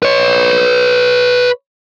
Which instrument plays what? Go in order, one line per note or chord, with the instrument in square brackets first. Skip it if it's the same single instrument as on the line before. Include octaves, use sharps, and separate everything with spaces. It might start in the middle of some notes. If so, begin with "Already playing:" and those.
[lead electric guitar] B4 C#5